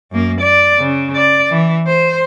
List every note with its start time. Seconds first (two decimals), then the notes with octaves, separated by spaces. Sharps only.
0.12 F#2 A#3
0.41 D5
0.79 C#3
1.15 D5
1.51 E3
1.87 C5